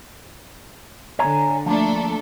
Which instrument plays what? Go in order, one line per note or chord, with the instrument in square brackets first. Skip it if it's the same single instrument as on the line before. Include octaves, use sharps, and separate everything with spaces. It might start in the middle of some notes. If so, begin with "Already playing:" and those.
[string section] D3 [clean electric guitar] C#5 G#5 A#5
[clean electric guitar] F3 A#3 [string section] A3 D4 A4